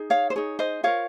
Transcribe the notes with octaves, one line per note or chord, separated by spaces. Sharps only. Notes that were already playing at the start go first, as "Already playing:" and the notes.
Already playing: D#4 G#4
C#5 F5
C5
D#4 G#4 C#5
C5 D#5
F4 A#4 C#5 F5